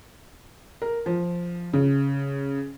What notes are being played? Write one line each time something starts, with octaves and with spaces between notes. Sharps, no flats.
A#4
F3
C#3